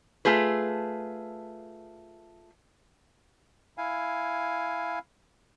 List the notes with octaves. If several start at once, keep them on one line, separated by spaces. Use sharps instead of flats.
A3 F4 G#4 B4
E4 F5 G#5